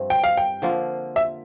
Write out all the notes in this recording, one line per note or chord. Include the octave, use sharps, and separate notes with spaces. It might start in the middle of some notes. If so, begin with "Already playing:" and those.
Already playing: G2 F3 C4 E4
G5
F5
G5
D3 F3 A#3 F4
E5